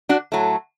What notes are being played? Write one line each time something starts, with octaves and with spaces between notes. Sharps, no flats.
D4 F#4
A2 F#3 A3